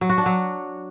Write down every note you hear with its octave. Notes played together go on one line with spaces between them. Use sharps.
F#3
F#4
D4
F#3